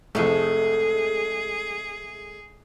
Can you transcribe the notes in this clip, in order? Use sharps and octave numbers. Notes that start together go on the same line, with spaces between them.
C2 F2 G#3 A3 G#4 A4